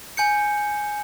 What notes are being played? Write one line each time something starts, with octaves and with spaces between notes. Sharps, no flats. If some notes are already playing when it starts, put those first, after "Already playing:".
G#5 G6 C#7